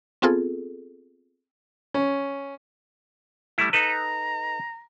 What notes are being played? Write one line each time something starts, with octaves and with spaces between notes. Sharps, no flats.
B3 C4 F4 G#4 A4
C#4
G3 A3 E4
D#4 A4 B4 A#5